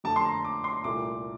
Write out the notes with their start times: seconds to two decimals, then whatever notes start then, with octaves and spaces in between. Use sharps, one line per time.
0.04 F2 D3 A3 A5
0.16 C6
0.25 A#5
0.45 D6
0.64 C6
0.84 C2 A#2 A3 D6